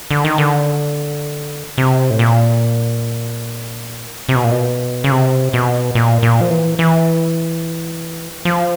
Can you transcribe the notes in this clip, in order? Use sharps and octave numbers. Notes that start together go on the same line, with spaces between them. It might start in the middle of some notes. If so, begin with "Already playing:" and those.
D3
D#3
D3
C3
A2
A#2
C3
B2
A#2
B2
C#3
C3
B2
A#2
A#2
F3
E3
E3
F3